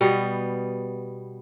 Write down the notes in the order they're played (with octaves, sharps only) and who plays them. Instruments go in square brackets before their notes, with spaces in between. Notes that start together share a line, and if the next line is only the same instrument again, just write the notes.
[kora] B2 G3 B3